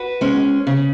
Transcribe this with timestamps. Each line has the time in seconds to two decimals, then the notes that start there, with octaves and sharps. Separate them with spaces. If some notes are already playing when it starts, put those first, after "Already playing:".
Already playing: F#4 B4
0.21 G#3 C#4
0.67 C#3